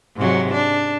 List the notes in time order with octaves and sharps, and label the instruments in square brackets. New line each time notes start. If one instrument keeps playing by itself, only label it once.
[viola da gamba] G#2 C3 F#3
D4